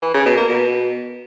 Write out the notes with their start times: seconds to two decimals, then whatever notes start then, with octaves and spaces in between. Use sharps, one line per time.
0.02 E3
0.14 C#3
0.26 B2
0.37 A#3
0.49 B2